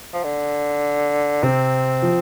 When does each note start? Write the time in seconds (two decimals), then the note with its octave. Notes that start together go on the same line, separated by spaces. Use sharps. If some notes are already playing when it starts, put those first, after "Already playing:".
0.13 F3
0.24 D3
1.43 C3 C4
2.02 F3